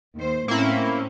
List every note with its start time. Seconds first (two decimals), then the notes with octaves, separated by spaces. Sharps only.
0.16 D#2 C5
0.48 A2 A#3 C4 C#4 E4